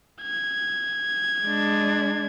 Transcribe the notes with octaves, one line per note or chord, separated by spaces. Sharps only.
G#6
G#3 D4